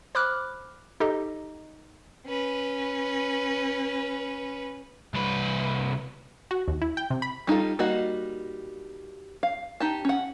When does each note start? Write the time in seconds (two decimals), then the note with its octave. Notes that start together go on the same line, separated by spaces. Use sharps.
0.15 C5 B5 D6 F6 F#6
1.00 D#4 G4 A4 D#5
2.26 C#4 B4
5.14 C2 B4
6.51 F#4
6.68 D#2
6.82 E4
6.97 G5
7.10 C3
7.22 B5
7.47 G3 D#4 F4 A4
7.79 G3 A#3 D#4 F#4 D#5
9.43 F5
9.80 D#4 G4 A5
10.05 C#4 F#5